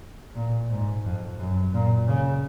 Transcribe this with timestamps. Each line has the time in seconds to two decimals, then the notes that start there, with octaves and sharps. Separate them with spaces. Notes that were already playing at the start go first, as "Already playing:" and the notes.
0.35 A#2
0.69 G#2
1.04 F2
1.39 F#2
1.73 A#2
2.08 C#3